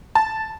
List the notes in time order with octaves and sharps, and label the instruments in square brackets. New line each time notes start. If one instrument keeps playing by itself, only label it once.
[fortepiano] A5